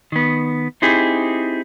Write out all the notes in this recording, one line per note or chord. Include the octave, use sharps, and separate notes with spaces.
D#3 B3
C4 D#4 E4 G4 G#4